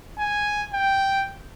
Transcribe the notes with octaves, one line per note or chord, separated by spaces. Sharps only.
G#5
G5